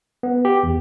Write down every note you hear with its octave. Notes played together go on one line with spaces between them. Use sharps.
B3
G4
E2